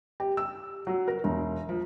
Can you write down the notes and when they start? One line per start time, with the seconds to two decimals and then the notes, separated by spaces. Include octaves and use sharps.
0.20 G4
0.37 E6
0.87 F#3
1.08 A#4
1.24 E1
1.69 F3